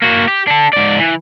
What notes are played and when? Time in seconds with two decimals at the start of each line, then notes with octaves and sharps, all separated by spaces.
0.02 A#3 F#4
0.28 G4
0.47 D4 A4
0.73 G#2 D5
0.98 E3